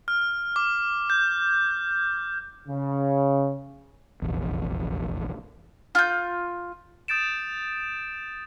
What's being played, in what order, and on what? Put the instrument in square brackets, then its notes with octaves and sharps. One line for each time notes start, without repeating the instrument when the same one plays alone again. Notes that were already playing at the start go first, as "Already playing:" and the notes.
[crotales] F6
D6
G6
[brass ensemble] C#3
[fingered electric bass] F1 A#1 E2
[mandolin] F4 G6
[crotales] D#6 G6 A6 D7 E7